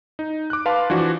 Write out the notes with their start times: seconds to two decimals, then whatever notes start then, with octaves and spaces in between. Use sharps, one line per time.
0.19 D#4
0.50 D6 F#6
0.66 B4 F5 A5 C6
0.90 E3 F3 D4 F#4